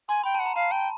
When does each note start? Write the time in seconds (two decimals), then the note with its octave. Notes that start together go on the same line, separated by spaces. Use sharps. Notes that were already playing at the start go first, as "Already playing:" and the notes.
0.09 G#5 C6
0.24 G5 B5
0.35 A5
0.39 F#5
0.46 A#5
0.55 F5 A5
0.71 G5 A5